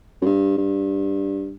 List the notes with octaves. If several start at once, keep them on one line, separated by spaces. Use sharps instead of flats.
F#2
G2
G2